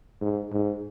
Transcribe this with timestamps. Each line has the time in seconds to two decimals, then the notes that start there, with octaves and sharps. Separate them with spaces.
0.21 G#2
0.52 G#2